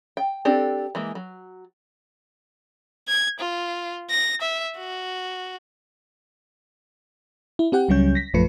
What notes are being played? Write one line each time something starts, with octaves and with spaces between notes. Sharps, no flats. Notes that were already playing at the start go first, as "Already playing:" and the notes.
G5
C4 D4 G4 A4
E3 G#3 A#3
F#3
G#6
F4
A#6
E5
F#4
E4
C4 G4 F#5 G5
C#2 F#3 G3 C#4 C#5 G6
A#6 B6
A#1 F#2 F3 A3 B4 C#7